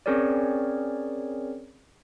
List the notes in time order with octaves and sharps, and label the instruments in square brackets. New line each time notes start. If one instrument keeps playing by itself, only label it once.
[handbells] C4 C#4 G#4 A#4 C#5 D5